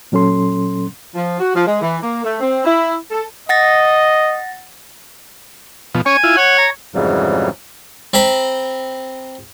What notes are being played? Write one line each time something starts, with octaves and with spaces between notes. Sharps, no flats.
A#2 F#3 C#4 A4 C6
F3
F#4
F3
G#3
E3
A#3
A3
C4
E4
A4
D#5 F#5 A6 A#6
B2 F3
C#4 C#5 G#5
E4 F4
C#5 F#5
A#5
F2 G#2 C#3 E3 F#3 G3
C4 G5 A#5 B5